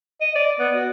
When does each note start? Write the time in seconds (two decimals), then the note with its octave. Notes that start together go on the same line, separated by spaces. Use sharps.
0.21 D#5
0.36 D5
0.59 B3
0.74 F#4